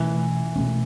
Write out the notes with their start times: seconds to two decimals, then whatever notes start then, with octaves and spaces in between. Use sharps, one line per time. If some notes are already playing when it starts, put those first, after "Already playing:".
Already playing: B2 E3 A3 C#4
0.56 B2 A3 C#4